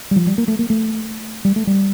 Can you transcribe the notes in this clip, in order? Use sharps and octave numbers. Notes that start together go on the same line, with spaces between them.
G3
F3
G3
A#3
A3
A#3
A3
G3
A3
G3